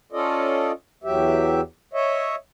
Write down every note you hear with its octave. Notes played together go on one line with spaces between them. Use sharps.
C#4 F4 A4 D5 D#5
E2 F#3 G4 E5
C#5 D#5 E5